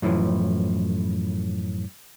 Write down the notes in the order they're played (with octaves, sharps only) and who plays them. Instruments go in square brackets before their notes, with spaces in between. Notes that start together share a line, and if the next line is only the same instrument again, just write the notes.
[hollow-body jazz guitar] F#2 A2 E3 F3